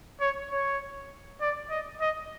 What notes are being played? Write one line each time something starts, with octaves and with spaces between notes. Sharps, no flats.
C#5
C#5
D5
D#5
D#5